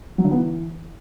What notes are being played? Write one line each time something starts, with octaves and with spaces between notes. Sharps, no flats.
F#3
D3
B3
E3